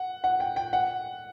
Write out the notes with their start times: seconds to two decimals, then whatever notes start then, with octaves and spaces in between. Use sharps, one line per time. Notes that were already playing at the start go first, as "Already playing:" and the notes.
Already playing: F#5
0.24 F#5
0.40 G5
0.56 G5
0.73 F#5